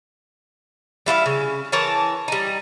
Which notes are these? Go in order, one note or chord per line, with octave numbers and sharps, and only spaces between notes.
G3 E4 F4 F5
C#3
E3 A#4 C#5 A5
G3 D#4